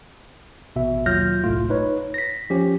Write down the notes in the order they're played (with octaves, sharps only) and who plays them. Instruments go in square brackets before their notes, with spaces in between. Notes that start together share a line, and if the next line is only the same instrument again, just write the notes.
[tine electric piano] A1 B2 E5
D#2 F#3 F4 F6 G6 A#6
G1 C2 A2 A3 F4
D#4 B4 C#5
A#6 B6
F3 C#4 G4